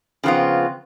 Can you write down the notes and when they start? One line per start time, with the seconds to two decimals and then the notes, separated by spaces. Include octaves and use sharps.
0.24 C#3 F3 B3 C4 F4